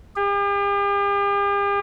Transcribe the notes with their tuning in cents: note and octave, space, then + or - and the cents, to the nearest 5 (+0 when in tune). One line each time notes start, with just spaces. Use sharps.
G4 +45